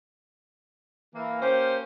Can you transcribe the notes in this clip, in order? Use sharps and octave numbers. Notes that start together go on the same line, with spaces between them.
E3 A#3
A#3 C#4 G4 C5